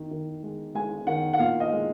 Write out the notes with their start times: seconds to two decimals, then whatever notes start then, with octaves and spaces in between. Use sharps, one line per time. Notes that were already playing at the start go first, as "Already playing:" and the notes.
Already playing: D#3
0.11 D#3
0.43 G#3
0.75 G#3 G#5
1.07 D#3 F#5
1.33 F#5
1.39 A#2 F5
1.60 D#5
1.72 G#3